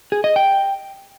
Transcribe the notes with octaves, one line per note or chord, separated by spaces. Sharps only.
G#4
D#5
G5